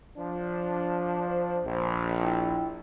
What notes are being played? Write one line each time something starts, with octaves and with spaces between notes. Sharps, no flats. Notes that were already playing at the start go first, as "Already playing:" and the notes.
F3 D4
C5
A#1
E4 G5